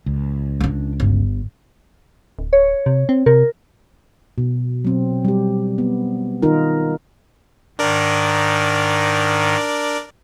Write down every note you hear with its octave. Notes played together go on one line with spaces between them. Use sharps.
C#2
C#4 D4
G1
D1
C#5
C3
C4
C3 A#4
B2
F#3 C4
G3 G4
B3
D#3 D#4 F4 A#4
G#2 D#3 D4 A#4 D5